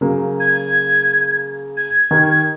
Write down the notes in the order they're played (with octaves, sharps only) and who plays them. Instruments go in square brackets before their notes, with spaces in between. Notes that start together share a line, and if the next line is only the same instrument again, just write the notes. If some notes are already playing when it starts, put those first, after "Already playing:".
[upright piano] C#3 F#3 A#3
[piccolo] G#6
G#6
[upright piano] D#3 G4 A#4